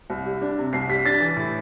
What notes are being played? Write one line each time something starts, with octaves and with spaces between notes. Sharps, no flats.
C2
G3
D4
C3
C2 C7
G3 B6
D4 A6
E3
A2